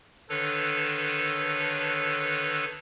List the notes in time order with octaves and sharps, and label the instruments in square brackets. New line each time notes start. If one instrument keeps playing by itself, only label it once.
[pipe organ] D3 D#3 D4 A4 B4 C#5